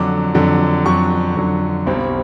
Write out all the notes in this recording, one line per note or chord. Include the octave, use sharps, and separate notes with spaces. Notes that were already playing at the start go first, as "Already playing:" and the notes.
Already playing: F2 D3 F#3 D6
F2 D3 F#3
F2 D3 F#3 C#6
F2 D3 F#3
B1 B2 G3 C4